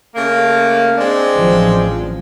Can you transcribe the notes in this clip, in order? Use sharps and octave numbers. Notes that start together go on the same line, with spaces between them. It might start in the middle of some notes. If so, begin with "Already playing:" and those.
C#3 A3 A#3
G#3 C4 D4
A1 F3